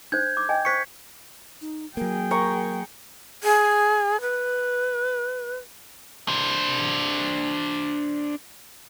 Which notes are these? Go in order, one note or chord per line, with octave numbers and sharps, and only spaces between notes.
D4 C5 G6 G#6
D6
D#5 G5 G#5
C5 C#6 G#6 B6 C#7
D#4
F#3 A#3 G#4 A#4 G5
A#4 A#5 C#6
G#4
B4
D4 C5